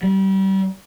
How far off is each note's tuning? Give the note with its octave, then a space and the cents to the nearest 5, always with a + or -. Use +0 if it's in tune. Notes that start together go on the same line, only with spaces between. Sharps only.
G3 -30